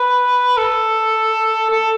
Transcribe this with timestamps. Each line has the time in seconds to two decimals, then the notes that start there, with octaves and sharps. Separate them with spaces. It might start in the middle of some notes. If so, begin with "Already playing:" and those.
Already playing: B4
0.57 A4
1.71 A4